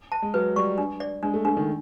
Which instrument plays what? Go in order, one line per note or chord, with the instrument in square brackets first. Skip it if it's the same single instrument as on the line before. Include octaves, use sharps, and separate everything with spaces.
[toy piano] A5
[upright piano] G#3
[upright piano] F#3 [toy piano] B4
[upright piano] G3 [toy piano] C#6
[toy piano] D4
D5
[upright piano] G#3 [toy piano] D4
[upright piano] A3
[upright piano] A3 [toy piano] D4
[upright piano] D#3